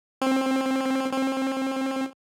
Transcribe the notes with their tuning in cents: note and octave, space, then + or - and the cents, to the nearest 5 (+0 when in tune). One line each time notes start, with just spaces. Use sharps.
C4 +20
C4 +30